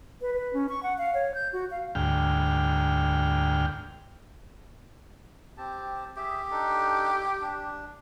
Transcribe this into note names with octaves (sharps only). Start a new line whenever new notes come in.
B4
B4
C#4
C#6
F#5
F5
C#5
G6
F#4
F5
D2 G#2 G5 F6
C4 G4 A5
G4 G#4 E5
D4 D#4 A4
D4